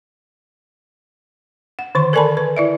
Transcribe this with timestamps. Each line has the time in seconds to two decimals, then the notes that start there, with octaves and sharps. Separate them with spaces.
1.79 F#5
1.95 D3 D#3 C6
2.13 A4 A#4 D5 G#5 A5 B5
2.37 B4
2.57 E4 D5 E5